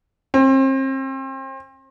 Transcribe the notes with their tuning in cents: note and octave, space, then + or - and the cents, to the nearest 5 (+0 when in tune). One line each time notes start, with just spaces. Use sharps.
C4 +35